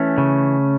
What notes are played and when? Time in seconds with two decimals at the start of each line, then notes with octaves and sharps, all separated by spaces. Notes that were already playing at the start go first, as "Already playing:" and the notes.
Already playing: E3 A3 C#4
0.18 C#3